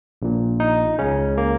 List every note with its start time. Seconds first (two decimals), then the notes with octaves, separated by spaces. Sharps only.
0.22 A#1 A#2
0.60 D#4
0.98 C#2 C#3 C#4
1.38 A#3